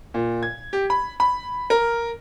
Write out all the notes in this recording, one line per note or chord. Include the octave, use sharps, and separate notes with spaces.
A#2
G#6
G4
B5
B5
A#4